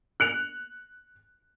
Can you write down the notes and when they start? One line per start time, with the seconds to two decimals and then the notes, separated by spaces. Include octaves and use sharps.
0.20 F#6 C#7 F7